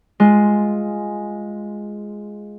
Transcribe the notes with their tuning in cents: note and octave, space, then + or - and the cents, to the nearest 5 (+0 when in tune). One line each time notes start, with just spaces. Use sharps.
G#3 +0 F4 +0